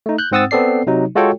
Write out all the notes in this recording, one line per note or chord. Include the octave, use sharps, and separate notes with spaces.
A3 D#4
F#6 G6
G#2 C4 F#5 D#6 E6 A6
B3 C4 A4 D5 C7
C3 F#3 D#4
G#3 F4 F#4 A4 C#5 G5